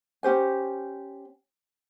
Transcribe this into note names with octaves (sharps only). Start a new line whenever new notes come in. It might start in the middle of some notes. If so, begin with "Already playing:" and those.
C#4 G4 C5 G#5